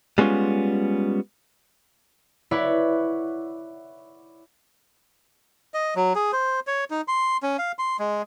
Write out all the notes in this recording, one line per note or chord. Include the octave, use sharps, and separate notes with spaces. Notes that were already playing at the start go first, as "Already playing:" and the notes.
G3 G#3 B3 C#4 F4
E4 B4 C#5 D5 F#5 B5
D#5
F#3
G#4
C5
C#5
D#4
C6
C#4
F5
C6
G#3